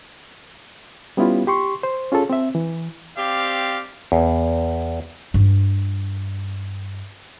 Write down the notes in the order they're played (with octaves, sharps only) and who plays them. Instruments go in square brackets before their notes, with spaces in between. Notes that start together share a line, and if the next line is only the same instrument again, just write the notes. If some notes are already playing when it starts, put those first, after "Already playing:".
[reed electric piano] G3 B3 C#4 E4 F4 G4
G4 C6 C#6
C5
C#4 F4 G#4 A4
C4 E5
E3
[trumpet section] C4 G4 D5 F5
[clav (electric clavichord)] E2
[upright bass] G2 F4